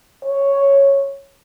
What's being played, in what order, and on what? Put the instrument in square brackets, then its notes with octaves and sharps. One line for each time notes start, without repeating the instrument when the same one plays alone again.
[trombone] C#5